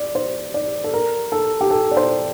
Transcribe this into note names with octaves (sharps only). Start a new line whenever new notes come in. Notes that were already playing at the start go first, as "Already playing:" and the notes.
Already playing: D5
C5
D5
A4
A#4
A4
G4
A4
D5
C5